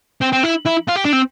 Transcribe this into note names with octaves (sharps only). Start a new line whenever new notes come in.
C4
C4
E4
E4
F4
G4
D4
C4